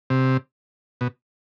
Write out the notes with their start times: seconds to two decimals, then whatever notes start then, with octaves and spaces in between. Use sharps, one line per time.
0.10 C3
1.01 B2